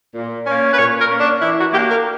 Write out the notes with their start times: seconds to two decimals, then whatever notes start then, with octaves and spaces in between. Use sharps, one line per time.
0.14 A#2
0.46 A#3 C#4
0.73 B4
0.79 A#2 C#5
0.99 A#4
1.10 A#3 C#4
1.20 D4
1.42 E3 E4
1.58 F#4
1.73 A#3 G4
1.77 D4
1.89 A#4